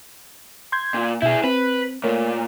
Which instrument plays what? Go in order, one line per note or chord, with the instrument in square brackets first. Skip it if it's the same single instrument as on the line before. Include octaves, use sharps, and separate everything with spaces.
[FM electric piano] C6 G6 G#6
[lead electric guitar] A#2
[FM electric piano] B2 E5 G6 [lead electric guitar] E4 G#4
[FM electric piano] C4 [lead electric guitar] B4
[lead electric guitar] A#2 [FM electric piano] A3 A#4 C#5